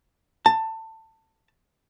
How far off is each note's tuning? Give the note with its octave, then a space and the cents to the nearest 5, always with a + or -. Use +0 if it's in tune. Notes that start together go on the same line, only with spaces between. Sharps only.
A5 +20